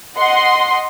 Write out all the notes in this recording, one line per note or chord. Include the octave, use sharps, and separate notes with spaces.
D#5 F#5 C6